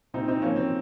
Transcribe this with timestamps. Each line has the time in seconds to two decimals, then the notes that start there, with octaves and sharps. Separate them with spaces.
0.14 A#2 C4 D#4
0.28 C4 D#4
0.42 F3 A#3 C#4
0.56 C4